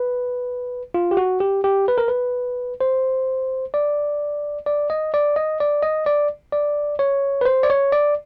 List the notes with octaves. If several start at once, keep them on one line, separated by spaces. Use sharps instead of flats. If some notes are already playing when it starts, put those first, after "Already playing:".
Already playing: B4
F4
G4
F#4
G4
G4
B4
A#4
B4
C5
D5
D5
D#5
D5
D#5
D5
D#5
D5
D5
C#5
B4
C5
D5
C#5
D5